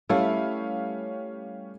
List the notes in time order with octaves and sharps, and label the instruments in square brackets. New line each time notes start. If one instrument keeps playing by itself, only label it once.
[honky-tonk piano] G3 C#4 F5 [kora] A3 E4 B4